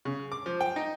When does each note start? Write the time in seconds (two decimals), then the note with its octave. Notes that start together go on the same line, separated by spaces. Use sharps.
0.05 C#3
0.32 D6
0.46 F3
0.61 G5
0.76 D#4